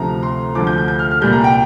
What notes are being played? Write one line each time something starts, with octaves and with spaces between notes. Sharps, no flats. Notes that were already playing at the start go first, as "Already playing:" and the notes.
Already playing: D2 C3 F3 A#5
C6
D2 D3 F3 D6
G6
G6
G6
F6
F6
C2 A#2 G3 G6
A#5
G5